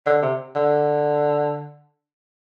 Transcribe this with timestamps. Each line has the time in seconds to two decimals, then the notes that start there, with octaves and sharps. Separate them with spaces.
0.06 D3
0.22 C3
0.56 D3